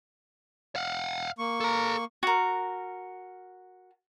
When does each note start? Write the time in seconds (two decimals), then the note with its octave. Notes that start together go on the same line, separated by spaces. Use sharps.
0.76 F5 F#5
1.39 A#3 C#6
1.61 A4 A#5
2.23 F#4 A#4